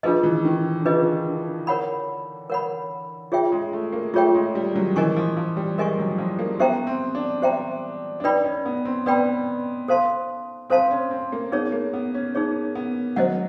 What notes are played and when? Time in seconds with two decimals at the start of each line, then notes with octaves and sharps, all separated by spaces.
0.03 F3 D4 F4 G#4 B4 D#5
0.23 E3
0.45 D#3
0.80 D3
0.85 C#3 D4 F4 G#4 B4 D#5
1.27 D3
1.67 A#4 C#5 F#5 B5
2.50 A#4 C#5 F#5 B5
3.32 F4 G#4 C#5 E5 G5
3.52 G#3
3.73 A3
3.93 A#3
4.14 A3 F4 G#4 C#5 E5 G5
4.35 G#3
4.55 G3
4.76 F#3
4.96 E3 A#4 D#5 G#5 C#6
5.16 F3
5.37 F3
5.57 G3
5.78 G#3 A#4 D#5 G#5 C#6
5.99 F#3
6.18 F3
6.39 A#3
6.59 B3 G4 C5 E5 G5 A#5
6.87 C4
7.15 D4
7.42 G4 C5 E5 G5 A#5
8.20 D4
8.24 D#4 B4 D5 G5 B5
8.44 C#4
8.66 B3
8.85 C4
9.06 B3 B4 D5 G5 B5
9.88 A4 C5 F5 A5 C6
10.70 C4 A4 C5 F5 A5 C6
10.91 C#4
11.11 C4
11.32 A#3
11.52 B3 D#4 G#4 C#5
11.72 A#3
11.93 B3
12.14 C#4
12.35 D#4 G#4 C#5
12.75 B3
13.16 F#3 C5 D#5 F#5